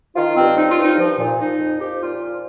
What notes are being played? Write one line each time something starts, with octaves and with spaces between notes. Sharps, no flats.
D#3 F4
G2 C4
F3 D#4
F4
G2
D#4
F3
A#2
F3 D#4
F2
F3 G4
A#2 F4
F3